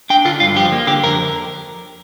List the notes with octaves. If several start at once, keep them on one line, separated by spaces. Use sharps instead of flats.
D4 G5
D3 F4
G2 F4
F3 G4
A#3
D3 G4
F2 A#4